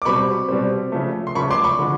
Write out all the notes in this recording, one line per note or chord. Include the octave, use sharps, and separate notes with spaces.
D6
B2 G3 C4 B5 C#6
B2 G3 C4
C#3 F3 A3
C6
C#3 F3 A3 B5 C#6
C6 D6
B5 C#6
D3 F3 G#3